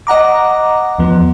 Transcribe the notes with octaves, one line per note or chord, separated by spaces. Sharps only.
D#5 F#5 A#5 D6
E2 F3 B3